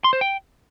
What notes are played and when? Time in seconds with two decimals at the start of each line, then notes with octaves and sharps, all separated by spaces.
0.04 C6
0.13 C5
0.21 G5